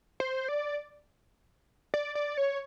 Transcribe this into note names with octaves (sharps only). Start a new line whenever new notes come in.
C5
D5
D5
D5
C#5